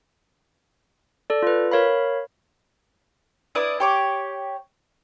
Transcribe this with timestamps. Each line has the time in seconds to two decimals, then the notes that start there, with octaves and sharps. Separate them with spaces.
1.30 A4 D5
1.42 F4 B4
1.71 A#4 C#5 F5 B5
3.55 D4 E4 B4 D#6
3.80 G4 C#5 D6